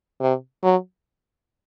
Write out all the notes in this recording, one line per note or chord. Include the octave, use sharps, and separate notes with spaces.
C3
F#3